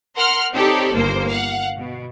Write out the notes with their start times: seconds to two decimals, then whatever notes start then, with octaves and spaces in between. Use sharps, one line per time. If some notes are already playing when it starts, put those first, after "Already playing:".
0.16 A#4 F#5 C6 F6
0.53 C4 D#4 G4 A4 C#5 D5
0.93 G1 D#2 A#3 C5
1.30 F5 F#5
1.77 B2